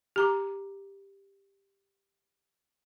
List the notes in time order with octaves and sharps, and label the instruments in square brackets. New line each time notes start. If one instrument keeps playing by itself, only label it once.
[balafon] G4 A#5 D6